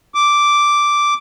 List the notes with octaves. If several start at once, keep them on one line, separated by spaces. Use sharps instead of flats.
D6